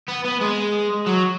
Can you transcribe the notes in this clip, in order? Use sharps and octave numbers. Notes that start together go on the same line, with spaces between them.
B3
B3
G#3
F#3